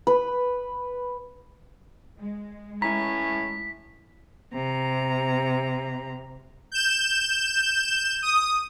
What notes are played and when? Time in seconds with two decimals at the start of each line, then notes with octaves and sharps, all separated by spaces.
0.07 B4
2.18 G#3
2.82 A2 E3 C#4 E4 A#5 B6
4.52 C3 A#5
6.72 G6 E7
8.22 D#6